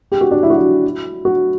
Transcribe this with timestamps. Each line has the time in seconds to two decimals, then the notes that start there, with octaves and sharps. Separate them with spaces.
0.12 G4
0.21 F#4
0.31 D4
0.43 E4
0.50 F#4
0.57 E4
1.25 F#4